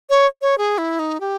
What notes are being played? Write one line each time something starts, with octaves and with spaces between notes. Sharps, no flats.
C#5
C#5
G#4
E4
D#4
G4